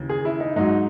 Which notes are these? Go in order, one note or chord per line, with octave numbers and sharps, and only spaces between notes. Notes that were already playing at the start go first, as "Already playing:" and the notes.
Already playing: D#2 C#3 E3
G#4
E4
D#4
G#2 F#3 D#4